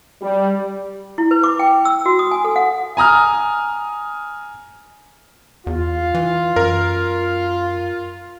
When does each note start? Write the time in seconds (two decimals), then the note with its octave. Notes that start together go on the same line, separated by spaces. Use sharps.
0.22 G3
1.18 E4
1.31 B4
1.43 D6
1.59 G5
1.85 E6
2.06 F#4
2.19 D#6
2.31 G#5
2.44 A4
2.56 F#5
2.97 G#5 A#5 D#6 F6
5.67 E2 F4
6.14 E3
6.56 F#2 A#4